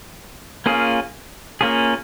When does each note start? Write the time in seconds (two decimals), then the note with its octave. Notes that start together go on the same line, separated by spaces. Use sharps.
0.66 A#3 C#4 F4 G#4
1.61 A#3 C#4 F4 G#4